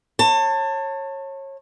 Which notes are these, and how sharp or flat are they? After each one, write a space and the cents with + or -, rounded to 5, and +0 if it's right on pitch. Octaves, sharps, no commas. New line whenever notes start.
C#5 -25 A5 +25